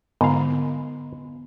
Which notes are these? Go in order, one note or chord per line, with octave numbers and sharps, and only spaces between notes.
G#2 D3 B3 F5